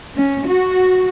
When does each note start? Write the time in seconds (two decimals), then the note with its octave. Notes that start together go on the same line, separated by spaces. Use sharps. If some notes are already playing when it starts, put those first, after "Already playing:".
0.15 C#4
0.47 F#4